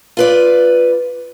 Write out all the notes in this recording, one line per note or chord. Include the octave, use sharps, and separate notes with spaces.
F4 B4 D5